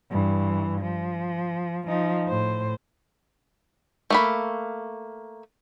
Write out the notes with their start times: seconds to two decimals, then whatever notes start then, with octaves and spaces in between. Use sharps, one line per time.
0.11 G2 E3
0.80 F3
1.87 F3 D#4
2.29 A2 C5
4.10 A3 A#3 B5